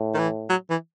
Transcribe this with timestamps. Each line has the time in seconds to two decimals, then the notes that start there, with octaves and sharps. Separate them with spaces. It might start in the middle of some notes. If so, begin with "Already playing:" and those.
Already playing: A2
0.15 D#3
0.18 E3
0.49 F#3
0.70 E3